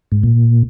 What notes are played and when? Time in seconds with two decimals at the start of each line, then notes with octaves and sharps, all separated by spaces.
0.12 G#2
0.23 A#2